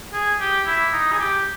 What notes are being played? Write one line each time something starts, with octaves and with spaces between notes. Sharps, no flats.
G#4
G4
E4
D#4
G#4
G4